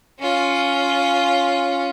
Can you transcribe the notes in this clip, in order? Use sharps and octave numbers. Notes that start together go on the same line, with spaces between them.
C#4 F4